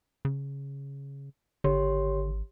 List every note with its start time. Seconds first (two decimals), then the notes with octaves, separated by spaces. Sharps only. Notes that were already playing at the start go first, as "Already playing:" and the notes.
0.25 C#3
1.64 G#1 D3 G4 C#5 C6